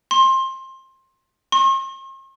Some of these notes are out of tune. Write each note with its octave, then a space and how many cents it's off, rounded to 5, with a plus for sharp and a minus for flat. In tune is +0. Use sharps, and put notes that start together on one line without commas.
C6 +20
C6 +45